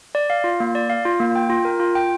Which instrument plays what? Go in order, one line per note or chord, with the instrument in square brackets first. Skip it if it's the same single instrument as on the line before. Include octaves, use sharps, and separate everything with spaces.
[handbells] D5
F5
F4
A#3
D5
F5
F4
A#3
G5
F4
A#4
F4
G5